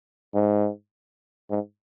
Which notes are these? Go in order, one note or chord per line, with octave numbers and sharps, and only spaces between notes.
G#2
G#2